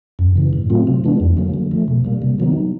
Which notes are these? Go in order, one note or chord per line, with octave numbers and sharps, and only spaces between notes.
F#2
C#3 E3
A2
F#3 A3 C4 F4
C3
E3 G#3 B3 D4
F2
D3 F#3 A#3
D3
F3 A3
B2
G3 A#3
C3
D#3 F#3 B3 D#4